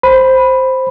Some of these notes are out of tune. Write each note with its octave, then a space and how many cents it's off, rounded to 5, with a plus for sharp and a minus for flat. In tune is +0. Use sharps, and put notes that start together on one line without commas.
C5 +0 B5 +0